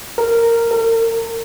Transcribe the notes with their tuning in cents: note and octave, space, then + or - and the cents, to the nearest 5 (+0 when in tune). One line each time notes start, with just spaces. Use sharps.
A#4 -10
A#4 -40